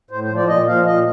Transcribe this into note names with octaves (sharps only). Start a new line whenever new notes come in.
A2 C5
C5
F3
D5
A#2 D#5
F3 F5
A#2 D#5